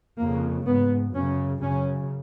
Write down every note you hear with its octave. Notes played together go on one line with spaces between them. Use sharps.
F2 C#3 A#3
G#2 B3
F#2 C#3 C#4
F#2 C#3 C#4